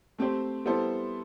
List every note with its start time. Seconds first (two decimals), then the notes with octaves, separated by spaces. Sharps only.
0.19 A3 C4 G4 C5
0.66 G3 B3 E4 A4 C5